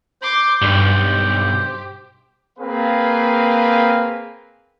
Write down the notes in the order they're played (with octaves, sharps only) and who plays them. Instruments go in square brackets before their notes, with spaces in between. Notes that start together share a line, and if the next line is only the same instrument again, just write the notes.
[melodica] C5 [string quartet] C6 D6
[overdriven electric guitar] B1 [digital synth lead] G2 [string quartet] G4
[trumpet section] A#3 C4 G#4 B4 F5